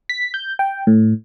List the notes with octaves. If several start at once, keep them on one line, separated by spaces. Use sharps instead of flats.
B6
G6
G5
A2